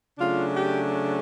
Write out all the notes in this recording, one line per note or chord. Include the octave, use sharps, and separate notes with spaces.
C#3 F#3 A3 D4 F4
G4